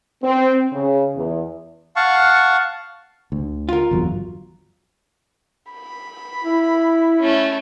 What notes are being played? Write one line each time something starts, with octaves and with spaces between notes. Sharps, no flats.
C4
C#3
E2
F5 F#5 A5 C#6
D2
F4 A#4
G1 E2 F#3
B5
E4
A3 C#4